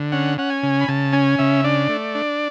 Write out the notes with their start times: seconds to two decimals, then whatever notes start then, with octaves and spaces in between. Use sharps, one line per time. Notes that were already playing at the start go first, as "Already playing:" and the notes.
Already playing: D3
0.12 C#4 F#5
0.38 C#4 F#5
0.50 G#5
0.63 C#3
0.81 B5
0.88 C#3 A5
1.13 C#4 G#5
1.38 C#3 E5
1.64 D4 D5
1.89 A3
2.15 D4